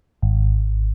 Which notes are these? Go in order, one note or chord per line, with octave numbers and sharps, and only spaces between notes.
G#1